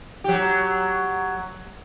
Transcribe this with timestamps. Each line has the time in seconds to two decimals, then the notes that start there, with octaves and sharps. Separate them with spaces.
0.24 F#3 G4